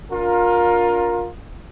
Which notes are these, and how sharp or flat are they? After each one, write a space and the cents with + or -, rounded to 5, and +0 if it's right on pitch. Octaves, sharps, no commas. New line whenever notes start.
D4 -30 F4 +25 A#4 +5